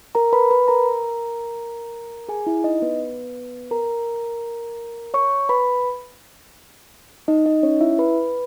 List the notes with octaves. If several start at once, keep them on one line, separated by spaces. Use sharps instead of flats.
A#4 A#5
B4 B5
B4 B5
A#4 A#5
G#4 G#5
E4 E5
D#4 D#5
B3 B4
A#4 A#5
C#5 C#6
B4 B5
D#4 D#5
D#4 D#5
C#4 C#5
E4 E5
B4 B5